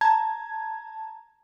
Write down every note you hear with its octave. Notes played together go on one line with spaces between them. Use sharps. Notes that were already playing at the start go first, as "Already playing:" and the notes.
A5 A#5 G#6